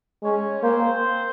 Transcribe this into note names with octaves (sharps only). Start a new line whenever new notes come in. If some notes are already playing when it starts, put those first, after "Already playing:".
G#3 C#4 C#5
A#3 C4 C5